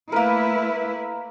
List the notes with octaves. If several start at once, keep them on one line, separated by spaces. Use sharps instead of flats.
A3 A#3 E4 A#4 B4